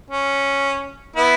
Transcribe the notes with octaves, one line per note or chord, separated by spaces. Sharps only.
C#4
B3 E4